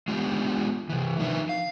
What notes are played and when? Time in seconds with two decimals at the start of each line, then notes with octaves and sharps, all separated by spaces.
0.08 G#3 B3 D4 F4 G4
0.89 C3 E3
1.19 D#3 F3 D4 D#4 B4 E5
1.49 F5